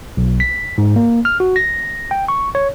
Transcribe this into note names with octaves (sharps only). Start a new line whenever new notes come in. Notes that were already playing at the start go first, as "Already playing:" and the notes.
B1
B6
G#2
A#3
F6
F#4
A#6
G5
C#6
C#5